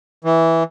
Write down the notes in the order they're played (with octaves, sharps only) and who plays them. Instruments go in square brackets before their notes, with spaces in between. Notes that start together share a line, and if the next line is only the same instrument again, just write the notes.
[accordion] E3